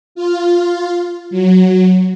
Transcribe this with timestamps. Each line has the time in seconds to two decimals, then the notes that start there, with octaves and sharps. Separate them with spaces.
0.15 F4
1.30 F#3